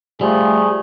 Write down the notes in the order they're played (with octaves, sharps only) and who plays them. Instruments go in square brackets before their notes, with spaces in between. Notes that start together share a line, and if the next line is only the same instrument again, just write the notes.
[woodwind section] C3 F3 A3 [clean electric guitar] G3 [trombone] G#4